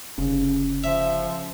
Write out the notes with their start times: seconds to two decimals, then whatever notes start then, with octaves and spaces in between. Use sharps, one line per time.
0.18 F1 C#3
0.84 F3 E5